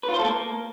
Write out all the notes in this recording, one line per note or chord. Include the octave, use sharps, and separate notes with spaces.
B4
F4
C5
A4
A#3